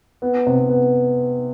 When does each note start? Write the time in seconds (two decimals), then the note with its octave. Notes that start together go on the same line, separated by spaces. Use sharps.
0.22 B3
0.46 C3
0.69 B3